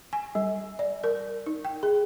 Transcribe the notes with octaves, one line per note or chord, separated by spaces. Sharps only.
G#5
G3
D5
A#4
D#4
G5
G#4